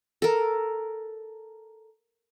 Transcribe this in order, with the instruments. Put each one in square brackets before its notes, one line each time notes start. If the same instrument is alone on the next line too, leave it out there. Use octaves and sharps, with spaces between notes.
[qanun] A4 A#4